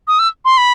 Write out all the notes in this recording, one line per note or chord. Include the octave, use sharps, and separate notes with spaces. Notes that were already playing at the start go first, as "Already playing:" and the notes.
D#6
E6
C6
B5